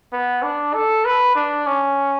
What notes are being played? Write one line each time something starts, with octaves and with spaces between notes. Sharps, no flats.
B3
D4
A4
B4
D4
C#4